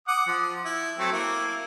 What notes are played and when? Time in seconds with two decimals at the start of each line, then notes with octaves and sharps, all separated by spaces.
0.08 F#5 D6 D#6
0.27 F3
0.65 E4
0.99 F#3 A3 C4
1.12 A#3 E4